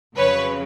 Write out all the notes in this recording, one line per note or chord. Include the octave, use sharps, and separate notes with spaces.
F2 C#3 F#3 B4 C#5